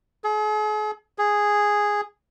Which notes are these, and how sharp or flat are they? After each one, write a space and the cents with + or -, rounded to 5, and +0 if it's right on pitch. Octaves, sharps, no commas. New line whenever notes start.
G#4 +40
G#4 -5